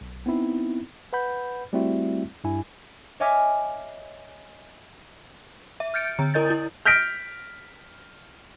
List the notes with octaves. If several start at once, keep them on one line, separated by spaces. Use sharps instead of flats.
B1
B3 C4 D#4 E4
B4 F#5 B5 G6
G3 A3 C4 E4 F#4 E5
G2 E4 G#5
C#5 D#5 E5 G#5 D6 F6
E5
F6 G6 A6 C#7 D7
D3 A#5
E4 A#4 D#5 G6 A6
E4
F6 G6 A#6 B6 D7